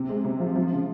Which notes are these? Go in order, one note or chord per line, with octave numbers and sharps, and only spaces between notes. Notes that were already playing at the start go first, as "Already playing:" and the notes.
Already playing: C3 C4
G#3
C3
F3
F3
C#3